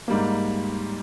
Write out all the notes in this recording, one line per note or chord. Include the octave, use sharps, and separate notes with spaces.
G#2 G3 A#3